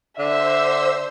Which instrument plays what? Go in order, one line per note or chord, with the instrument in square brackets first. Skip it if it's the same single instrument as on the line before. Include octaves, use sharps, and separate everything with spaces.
[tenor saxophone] D3 [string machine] C5 E6 [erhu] E5